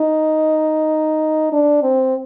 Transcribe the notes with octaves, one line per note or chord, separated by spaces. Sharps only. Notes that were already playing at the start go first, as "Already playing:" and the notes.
Already playing: D#4
D4
C4